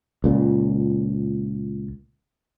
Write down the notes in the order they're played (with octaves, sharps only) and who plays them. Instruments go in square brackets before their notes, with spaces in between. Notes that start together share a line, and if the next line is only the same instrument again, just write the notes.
[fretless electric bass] C#2 A#2